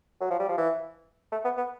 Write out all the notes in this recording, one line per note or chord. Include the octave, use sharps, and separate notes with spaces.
F#3
F3
G3
F3
E3
A3
B3
B3